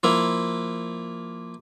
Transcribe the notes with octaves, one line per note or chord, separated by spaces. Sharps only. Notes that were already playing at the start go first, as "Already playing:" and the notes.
F3 A#3 E4